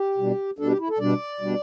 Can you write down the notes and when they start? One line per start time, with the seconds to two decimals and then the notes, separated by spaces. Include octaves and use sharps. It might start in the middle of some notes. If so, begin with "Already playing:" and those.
Already playing: G4
0.18 B2 G3 D4
0.58 B2 G3 D4 A4
0.69 G4
0.79 E4
0.89 A4
0.99 B2 G3 D4 D5
1.41 B2 G3 D4